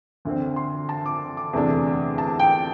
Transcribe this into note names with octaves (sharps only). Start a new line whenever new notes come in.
D2 D3 C4
C6
A5
D6
D6
E2 C3 A3 D4
A5
G5